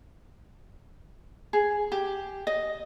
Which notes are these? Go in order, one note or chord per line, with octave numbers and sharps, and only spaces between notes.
G#4
G4
D#5